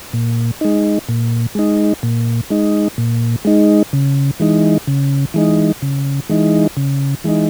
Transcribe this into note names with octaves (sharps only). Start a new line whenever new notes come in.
A#2
G#3 D#4
A#2
G#3 D#4
A#2
G#3 D#4
A#2
G#3 D#4
C#3
E3 G#3 D#4
C#3
E3 G#3 D#4
C#3
E3 G#3 D#4
C#3
E3 G#3 D#4